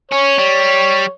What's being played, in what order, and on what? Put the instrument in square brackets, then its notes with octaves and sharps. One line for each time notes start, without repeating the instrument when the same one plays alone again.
[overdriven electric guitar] C#4 [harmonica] C#5
[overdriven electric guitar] G3